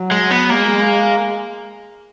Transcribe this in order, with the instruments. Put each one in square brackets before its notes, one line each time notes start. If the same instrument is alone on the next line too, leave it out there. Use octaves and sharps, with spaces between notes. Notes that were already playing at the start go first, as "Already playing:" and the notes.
Already playing: [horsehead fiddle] F#3
[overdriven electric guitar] G#3
B3
[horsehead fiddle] G#3 [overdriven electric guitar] A#3